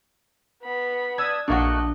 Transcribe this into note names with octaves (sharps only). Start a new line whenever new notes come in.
B3 B5
D4 D#6 E6 G#6
A#1 A3 A#3 D4 F#4 D#5